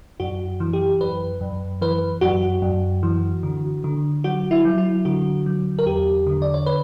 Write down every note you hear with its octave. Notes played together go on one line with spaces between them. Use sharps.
F#2 F#4
E3
G4
F#2 B4
F#2
E3 B4
F#2 F#4
F#2
E3
D3
D3
F#3 F#4
E4
F#3
E4
D3 F#4
F#3
A#4
E2 G4
D3
D5
C#5
B4